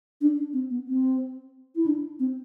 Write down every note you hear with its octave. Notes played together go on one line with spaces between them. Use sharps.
D4
D4
C4
B3
C4
E4
D4
C4